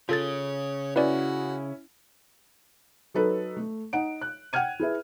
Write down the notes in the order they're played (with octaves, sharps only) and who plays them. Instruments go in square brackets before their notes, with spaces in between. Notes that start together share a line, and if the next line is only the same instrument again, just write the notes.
[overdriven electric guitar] C#3 [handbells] F4 A4 A6 [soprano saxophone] C#5
[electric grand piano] C#4 E4 [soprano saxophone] F#4 [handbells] B4 D5
[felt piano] F#3 D#4 A4 B4
A3
D#4 F#5 D7
F#6
F#5 G5 F6 G#6 D#7
E4 G#4 B4 E5